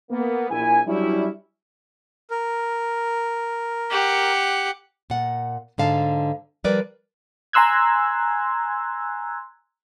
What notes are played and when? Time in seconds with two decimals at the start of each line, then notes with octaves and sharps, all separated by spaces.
0.10 A#3 B3
0.50 A#1 E4 G#5
0.86 F#3 G3 C#4 D4 E4
2.30 A#4
3.91 G4 F#5
5.10 A#2 F#5
5.78 G#2 D3 F5 A5
6.64 F3 G3 A#4 B4 D5
7.53 G#5 A#5 C6 E6 F#6 G#6